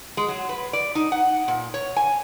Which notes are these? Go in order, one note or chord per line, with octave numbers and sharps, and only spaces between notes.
G#3
F#3
B4
D5
D#4
F#5
A#2
C#5
G#5